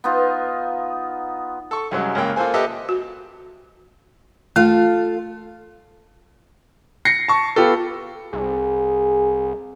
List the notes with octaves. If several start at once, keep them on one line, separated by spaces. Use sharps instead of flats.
B3 D#4 F4
A4 C#6
C2 F#2 F#3 G#3
C#2 F#2 A#3 G5
A#3 F4 A4 C5 G#5
G4 A4 B4 D#5 E5 D6
F#4
A3 F4 A4 F5
A#6 C7 C#7
A5 C#6
B3 F4 G4 A4
C2 G#4